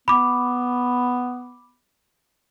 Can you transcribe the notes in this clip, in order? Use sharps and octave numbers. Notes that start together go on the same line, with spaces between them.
B3 B5 D6